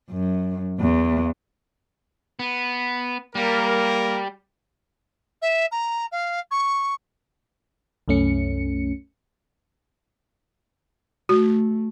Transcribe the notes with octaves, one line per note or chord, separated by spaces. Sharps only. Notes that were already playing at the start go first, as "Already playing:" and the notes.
F#2
E2
B3
G3 A#3 A#4
E5
A#5
F5
C#6
C2 F#2 A3 C#4 C#7
A3 F#4